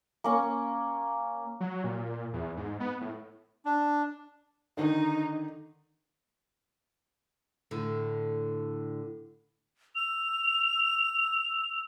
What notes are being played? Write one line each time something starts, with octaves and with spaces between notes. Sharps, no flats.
A#3 C#4 C#6
F#3
A#2
E2
G#2
B3
A2
D4
D3 D#3 D#4
A2 D3
E6 F7